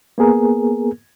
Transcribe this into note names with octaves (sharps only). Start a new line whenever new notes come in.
A#3 B3 G#4 A#4